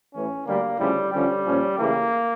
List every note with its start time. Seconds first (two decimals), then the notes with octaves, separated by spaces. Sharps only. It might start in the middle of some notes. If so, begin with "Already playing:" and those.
0.14 A1 A2 E3 C#4
0.46 D2 D3 G3 A#3
0.79 D2 C#3 F3 G3 C#4 E4
1.12 D3 F3 G3 C#4
1.45 A#2 F3 C#4
1.78 C#3 E3 A3 A#3 E4 G4